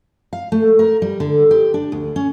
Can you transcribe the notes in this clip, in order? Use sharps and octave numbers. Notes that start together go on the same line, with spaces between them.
F5
A3
A#4
G3
D3
G4
D4
D2
C#4